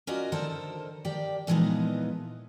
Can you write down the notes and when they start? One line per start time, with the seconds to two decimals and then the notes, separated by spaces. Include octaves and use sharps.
0.07 C#4 F4 F#4 A#4 D5 D#5
0.32 D3 D#3 A4 A#4 C5
1.05 D#3 G4 D5 G5
1.47 A#2 E3 F3 G#3 B3 D#4